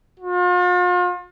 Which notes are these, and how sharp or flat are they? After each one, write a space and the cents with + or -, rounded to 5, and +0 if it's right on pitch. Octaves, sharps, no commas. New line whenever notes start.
F4 +40